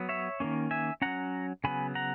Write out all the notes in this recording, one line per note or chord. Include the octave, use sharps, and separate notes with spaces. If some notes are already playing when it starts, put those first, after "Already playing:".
Already playing: F#3 B3
C#5 E5
D#3 A#3 C#4
E5 G#5
F#3 C#4 F#5 A#5
C#3 F#3 B3 G#5 B5
F#5 A#5